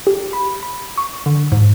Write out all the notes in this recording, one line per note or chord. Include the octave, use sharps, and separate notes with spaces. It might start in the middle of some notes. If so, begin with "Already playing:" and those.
G4
B5
B5
C#6
D3
G#2